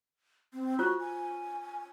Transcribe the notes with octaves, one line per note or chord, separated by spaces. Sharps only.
C4
F4 F#4 C5
G#5